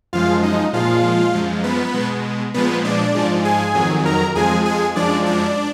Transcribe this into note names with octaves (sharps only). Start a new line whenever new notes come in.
F#2 F3 G#3 F4 F5
D#4 D#5
A#2 F3 G#3 F4 F5
F#2 F3 G#3
B3 B4
B2 G#3
A#2 F3 G#3 B3 B4
D4 D5
G#2 F3 G#3
G#4 G#5
F2 D#3 F#3
A#4 A#5
F2 F3 G#3 G#4 G#5
G#4 G#5
F#2 F3 G#3 D4 D5
D4 D5